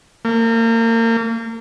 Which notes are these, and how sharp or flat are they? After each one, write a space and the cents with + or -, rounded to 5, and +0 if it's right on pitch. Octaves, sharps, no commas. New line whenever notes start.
A#3 -35